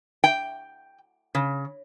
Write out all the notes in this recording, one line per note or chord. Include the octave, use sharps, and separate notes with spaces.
G5
C#3